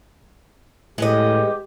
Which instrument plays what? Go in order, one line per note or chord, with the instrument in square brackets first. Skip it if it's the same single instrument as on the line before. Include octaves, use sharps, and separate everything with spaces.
[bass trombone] A2 [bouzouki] G#3 B3 D#5 [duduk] G4